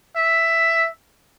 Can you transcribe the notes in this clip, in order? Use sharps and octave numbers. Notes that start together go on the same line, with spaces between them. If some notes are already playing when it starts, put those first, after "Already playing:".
E5